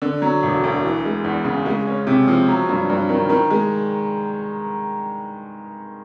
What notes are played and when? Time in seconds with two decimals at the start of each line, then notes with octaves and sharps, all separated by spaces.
0.02 D3
0.22 F#3
0.43 E1
0.64 D2
0.83 E3
1.05 G#3
1.24 E2
1.45 C#3
1.66 G#3
1.87 C#4
2.07 C3
2.28 F3
2.48 F#3
2.69 G2
2.90 G2
3.09 D#3
3.29 D#3
3.50 G#3